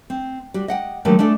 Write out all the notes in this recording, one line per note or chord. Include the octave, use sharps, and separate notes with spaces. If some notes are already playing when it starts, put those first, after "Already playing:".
C4
G3 F#4
D#5 F#5 G5
D3 D#3 F#3 G3 A3 A#3
G#3 A3 D4 A4